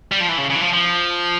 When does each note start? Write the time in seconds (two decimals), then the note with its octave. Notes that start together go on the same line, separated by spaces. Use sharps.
0.12 G3
0.20 F3
0.29 E3
0.38 C#3
0.50 C#3
0.55 E3
0.62 F3
0.73 F3